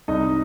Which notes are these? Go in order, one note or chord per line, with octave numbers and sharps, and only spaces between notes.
C2 D#4 D#5